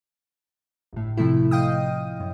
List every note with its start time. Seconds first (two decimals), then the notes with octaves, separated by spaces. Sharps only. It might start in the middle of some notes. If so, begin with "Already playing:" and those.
0.93 G1 A2
1.17 C3 F3 A3 E4
1.51 D#5 F5 G5 D#6
2.20 F#2